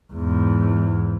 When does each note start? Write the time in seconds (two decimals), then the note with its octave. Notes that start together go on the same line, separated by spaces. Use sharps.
0.13 E2 G#2